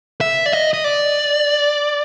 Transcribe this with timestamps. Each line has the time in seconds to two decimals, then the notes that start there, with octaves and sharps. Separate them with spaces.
0.21 E5
0.46 D5
0.53 D#5
0.74 D#5
0.84 D5